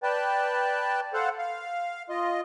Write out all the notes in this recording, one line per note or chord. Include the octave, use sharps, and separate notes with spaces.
B4 D5 G5 A5
A4 C5 F5 F#5
F5
F4 D#5